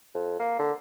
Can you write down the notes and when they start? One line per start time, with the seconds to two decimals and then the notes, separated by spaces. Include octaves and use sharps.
0.15 F2
0.39 A#3
0.59 D3